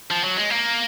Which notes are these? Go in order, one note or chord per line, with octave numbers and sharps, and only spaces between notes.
F3
F#3
G#3
A#3